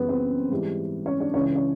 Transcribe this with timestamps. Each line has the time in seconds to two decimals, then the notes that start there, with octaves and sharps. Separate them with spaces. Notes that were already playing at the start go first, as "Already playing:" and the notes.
Already playing: F#2 C#3 E3 G3 B3 B4
0.09 C4 C5
0.51 G#2 E3 G3
1.06 C#4 C#5
1.20 D4 D5
1.34 C#2 C#3 E3 C#4 C#5
1.55 C#4 C#5